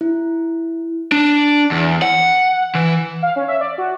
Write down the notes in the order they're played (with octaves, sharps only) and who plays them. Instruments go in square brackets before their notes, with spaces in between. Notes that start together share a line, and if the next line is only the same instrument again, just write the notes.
[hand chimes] E4
[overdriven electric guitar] D4
E2
F#5
E3
[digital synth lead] F5
C#4
E5
D5
F#4